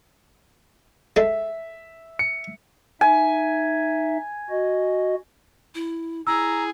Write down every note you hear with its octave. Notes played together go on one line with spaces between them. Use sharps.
G#3 A4 E5
C#7
D#4 E5 G#5
F#4 D#5
E4
E4 G#4 A#5 E6